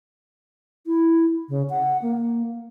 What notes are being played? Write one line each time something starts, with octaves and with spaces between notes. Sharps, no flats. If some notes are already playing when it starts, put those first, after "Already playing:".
E4
C#3
F#5
A#3